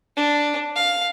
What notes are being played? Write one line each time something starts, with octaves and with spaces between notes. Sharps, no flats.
D4
F5